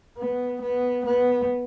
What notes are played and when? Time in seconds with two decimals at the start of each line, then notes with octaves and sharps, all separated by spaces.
0.18 B3
0.62 B3
1.06 B3